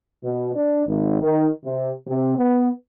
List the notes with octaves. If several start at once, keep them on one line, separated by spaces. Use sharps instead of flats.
B2
D4
G#1
D#3
C3
C3
B3